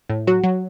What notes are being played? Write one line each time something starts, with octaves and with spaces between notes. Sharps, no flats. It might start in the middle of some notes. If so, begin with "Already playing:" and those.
A2
F#3 F#4
F#3